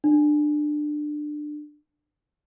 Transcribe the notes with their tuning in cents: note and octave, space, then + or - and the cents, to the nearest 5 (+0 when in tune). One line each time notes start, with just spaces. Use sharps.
D4 +20